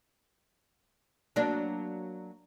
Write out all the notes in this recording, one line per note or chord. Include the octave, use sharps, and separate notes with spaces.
F#3 A#3 D4